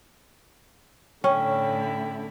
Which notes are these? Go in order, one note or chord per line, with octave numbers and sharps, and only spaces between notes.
A2 D3 C#4 E4 G5